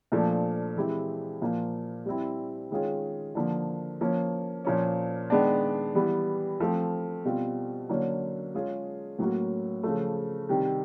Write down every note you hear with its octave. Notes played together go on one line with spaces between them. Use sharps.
A#2 F3 A3 D4
E3 G#3 C4 E4 G4
A#2 F3 A#3
G3 C4 E4
D#3 G#3 C#4 F4 G#4
D3 F3 A#3
F3 A#3 C#4
A#2 F3 A#3 C#4
D#3 G#3 B3 D4
E3 G3 B3
F3 A3 C4
B2 G3 C4 F4
D3 F#3 A#3 C#4
G#3 C#4 F4 G#4
A2 F#3 A#3 C#4 F#4
C#3 F3 A3
C3 D#3 G3